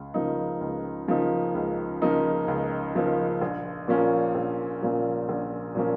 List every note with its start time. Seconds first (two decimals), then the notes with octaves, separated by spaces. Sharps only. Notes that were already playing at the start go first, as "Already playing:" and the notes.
Already playing: C#2
0.14 C#3 F3 A#3 D#4
0.61 C#2
1.08 C#3 F3 A#3 D#4
1.55 C#2
2.02 C#3 F3 A#3 D#4
2.48 C#2
2.95 C#3 F3 A#3 D#4
3.42 A#1
3.88 A#2 F3 A#3 C#4
4.35 A#1
4.82 A#2 F3 A#3 C#4
5.29 A#1
5.75 A#2 F3 A#3 C#4